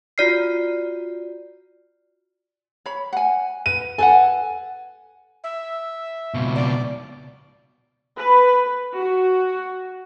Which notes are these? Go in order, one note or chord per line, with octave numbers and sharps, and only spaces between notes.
F4 F#4 D5 F6 C7
C#5 B5
F#5 G#5
B4 D#7
A4 B4 F#5 G#5
E5
C#2 B2
D5
B4
F#4